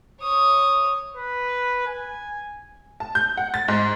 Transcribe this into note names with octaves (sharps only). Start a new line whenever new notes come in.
C#5 D#6
B4
G#5
A5
G6
F#5
A6
G#2